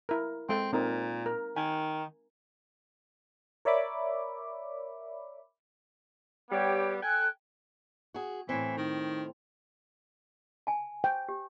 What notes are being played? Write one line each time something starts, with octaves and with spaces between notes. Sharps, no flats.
E4 A#4
G#3 C4 A4
A#2 C4 D#4 A#4
A#4
D#3 G#5
A#4 C#5 D5 E5 B5 D6
G3 B3 G4 C#5 G5
A4 G5 G#5 F#6
F#4 G#4
A2 E3 C4
D#3
G#5 A5
G5
G4